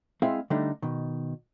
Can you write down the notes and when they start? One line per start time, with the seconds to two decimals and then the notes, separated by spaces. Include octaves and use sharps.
0.22 G#3 C4 E4 G#4 E5 F5
0.50 D3 G3 A3 D4 D#4
0.82 B2 D#3